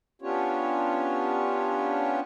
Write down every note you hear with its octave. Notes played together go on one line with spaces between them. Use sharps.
B3 C#4 D4 F4 G4 C#5